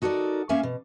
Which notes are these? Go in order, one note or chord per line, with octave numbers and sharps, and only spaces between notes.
D#4 F#4 A4 A#4 D5
A#3 C#4 E5 F5 G#5
B2